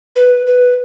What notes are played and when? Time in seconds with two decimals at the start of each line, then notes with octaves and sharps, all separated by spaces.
0.16 B4
0.47 B4